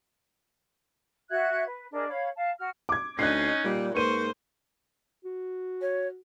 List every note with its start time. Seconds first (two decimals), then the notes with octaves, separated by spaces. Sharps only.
1.29 F#4 E5 F#6 G#6
1.66 B4
1.92 D4 G#4 A#4 D#5
2.08 C#5 F5 B5
2.35 F5 A5
2.58 F#4 F6
2.89 D6 G#6
3.19 D2 C#4 D#4 F#6 C7
3.64 A#2 G3
3.95 G#2 A#3 B4 C5 C#6 D#7
5.25 F#4
5.81 C#5